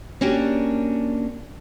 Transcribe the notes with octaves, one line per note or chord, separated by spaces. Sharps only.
A#3 C#4 D4 F#4 G4 A#4